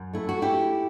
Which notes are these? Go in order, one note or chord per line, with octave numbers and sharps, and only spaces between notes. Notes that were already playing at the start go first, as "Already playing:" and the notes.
Already playing: F#2
A3 E4
F#4
E2 E4 G4